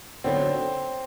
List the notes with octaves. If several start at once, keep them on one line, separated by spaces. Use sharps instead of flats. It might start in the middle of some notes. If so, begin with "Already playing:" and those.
D3 F#3 B3 C4 D#4